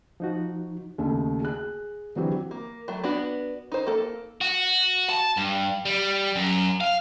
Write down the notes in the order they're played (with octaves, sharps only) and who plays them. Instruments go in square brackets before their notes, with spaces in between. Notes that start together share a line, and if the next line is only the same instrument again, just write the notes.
[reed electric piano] F3 D#4 F#4
[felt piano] D#2 C#3 A3
G#4 F#6
D3 E3 F#3 C4 F#4 G4
[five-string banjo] A#3
F#3 A3
B3 D4 F#4
D#4 C5
A#3 A4
[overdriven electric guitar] F#4
A5
G2
G3
F#2
F5